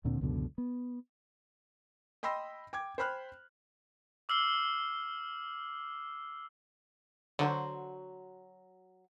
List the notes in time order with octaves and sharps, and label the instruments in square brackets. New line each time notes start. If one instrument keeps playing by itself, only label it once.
[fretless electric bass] D2 A#2 D3 C4
C#2 F#2 B2 D3
B3
[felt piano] D#5 G5 B5 C6 E6 A#6
G5 D6 G#6
C5 G5 B5 F6 F#6
[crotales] D6 E6 F6 C7 G7
[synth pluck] D3 [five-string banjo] F#3 F#4 C5